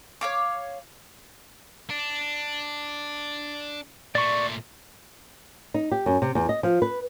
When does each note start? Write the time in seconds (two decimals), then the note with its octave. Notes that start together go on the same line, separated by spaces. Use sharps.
0.21 C#5 F5 D6
1.90 D4
4.15 A#2 A3 D5 C#6
5.74 D#4
5.92 G4
6.06 F#2
6.22 C3
6.35 E2
6.49 D#5
6.63 F3
6.82 B4